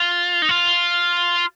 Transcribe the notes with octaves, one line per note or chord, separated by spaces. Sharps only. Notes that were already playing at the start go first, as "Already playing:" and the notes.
Already playing: F4
D#4
F4